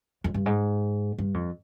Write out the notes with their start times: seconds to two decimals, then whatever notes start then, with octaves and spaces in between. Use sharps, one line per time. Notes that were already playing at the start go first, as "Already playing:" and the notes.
0.24 F2
0.34 G2
0.46 G#2
1.18 G2
1.34 F2